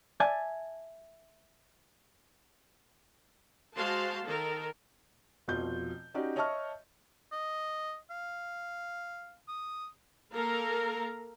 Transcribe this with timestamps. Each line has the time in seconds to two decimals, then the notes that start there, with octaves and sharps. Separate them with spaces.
0.20 D5 E5 G#5 A5
3.75 G#3 F#4 C5 F5 A5 C6
4.25 D#3 A4 A#4
5.48 F1 B2 F3 F4 G6
6.14 C#4 D#4 F#4 G4 D5
6.36 C#5 D#5 E5 A5 C#6 F6
7.32 D#5
8.10 F5
9.48 D#6
10.33 A#3 A4 A#4 F5 A#5